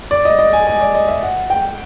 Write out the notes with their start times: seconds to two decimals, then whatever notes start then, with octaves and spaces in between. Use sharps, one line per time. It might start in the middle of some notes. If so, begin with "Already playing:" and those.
0.11 D5
0.25 D#5
0.39 D#5
0.53 G#5
0.67 G#5
0.81 D5
0.95 D#5
1.08 E5
1.23 F#5
1.50 G5